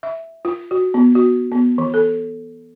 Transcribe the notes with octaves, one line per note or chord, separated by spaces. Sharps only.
E5
F4
F#4
B3
F#4
B3
E3
A4